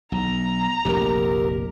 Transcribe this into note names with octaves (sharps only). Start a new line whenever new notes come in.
B1 A#5
F1 A#1 G4 A#4